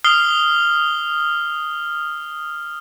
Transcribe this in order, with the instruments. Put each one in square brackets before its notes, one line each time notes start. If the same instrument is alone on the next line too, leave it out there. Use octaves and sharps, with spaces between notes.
[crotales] D#6 F6 C7 G7